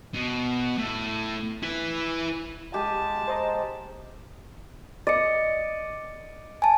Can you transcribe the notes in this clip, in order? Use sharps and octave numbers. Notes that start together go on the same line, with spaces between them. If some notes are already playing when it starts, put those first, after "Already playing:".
B2
A2
E4 B4
G#3 G4 G#5 A5
C5 D#5 A#5
D5 D#5 A6 C#7
G#5 A5